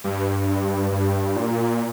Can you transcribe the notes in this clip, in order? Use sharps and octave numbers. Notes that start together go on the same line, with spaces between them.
G2
G2
A#2